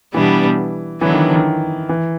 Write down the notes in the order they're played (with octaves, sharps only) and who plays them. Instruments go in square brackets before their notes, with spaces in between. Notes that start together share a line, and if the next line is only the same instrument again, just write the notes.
[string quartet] B2 G3 B3 D4 [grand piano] E3
[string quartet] D3 F#3 B3 D4 [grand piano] E3
[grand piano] D#3
D#3
E3